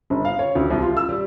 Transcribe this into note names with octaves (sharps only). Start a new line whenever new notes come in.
G1
F5
C#5
D2
C2
F4
E6
G3